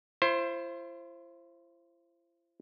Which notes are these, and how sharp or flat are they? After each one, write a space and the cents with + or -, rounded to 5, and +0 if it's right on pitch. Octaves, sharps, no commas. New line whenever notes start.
E4 +45 C5 +15